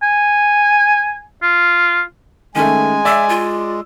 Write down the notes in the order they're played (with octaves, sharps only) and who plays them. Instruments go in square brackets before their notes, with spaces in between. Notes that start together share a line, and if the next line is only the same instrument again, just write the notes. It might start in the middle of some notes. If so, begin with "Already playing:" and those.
[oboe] G#5
F4
[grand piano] D#3 A3 [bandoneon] G#3 [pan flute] C#4 [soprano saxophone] G#5
[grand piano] D5 E6 [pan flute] E5
[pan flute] F4